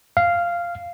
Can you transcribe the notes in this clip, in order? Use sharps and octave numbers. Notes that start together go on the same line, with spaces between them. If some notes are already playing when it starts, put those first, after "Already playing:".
F5